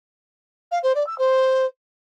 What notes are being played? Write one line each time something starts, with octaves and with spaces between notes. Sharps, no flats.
F5
C5
D5
E6
C5